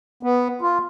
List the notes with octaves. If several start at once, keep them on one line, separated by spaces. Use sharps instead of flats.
B3
F4